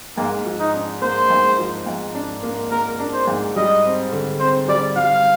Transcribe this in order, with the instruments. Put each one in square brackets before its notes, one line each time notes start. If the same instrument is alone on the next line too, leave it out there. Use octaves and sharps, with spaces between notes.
[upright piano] G#2 [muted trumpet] A#3
[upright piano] F3
[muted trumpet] D#4
[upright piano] D4
[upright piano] A#3 [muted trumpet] C5
[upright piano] G#2
F3
G#2
D4
A#3
[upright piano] A#3 [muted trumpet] A#4
[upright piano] D4
[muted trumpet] C5
[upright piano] G#2
[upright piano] G3 [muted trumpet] D#5
[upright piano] C4
D3
[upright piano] C4 [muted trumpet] C5
[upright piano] G3 [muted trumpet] D5
[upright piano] G3 [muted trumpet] F5